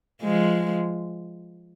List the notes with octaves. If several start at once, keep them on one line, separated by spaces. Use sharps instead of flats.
F3 G#3